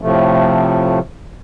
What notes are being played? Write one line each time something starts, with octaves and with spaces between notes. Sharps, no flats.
A2 C3 F3 A3